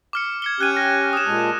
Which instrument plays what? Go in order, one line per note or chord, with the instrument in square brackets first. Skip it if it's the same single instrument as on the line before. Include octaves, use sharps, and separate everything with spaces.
[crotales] D6 F6 C#7
G#6 C#7 G7
[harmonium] C#4 G4 [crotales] F#6 G#6 D#7
[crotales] A#6
D#6 E7
[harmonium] A#2 G#3 A5